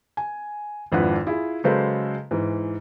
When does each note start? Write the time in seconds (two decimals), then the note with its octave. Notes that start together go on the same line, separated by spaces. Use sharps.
0.17 G#5
0.92 G#1 F2 D4 E4 B4 F#5
1.27 E4 F4 G#4
1.64 C#3 F#3 G#3 A4 B4 C5
2.31 G#2 E3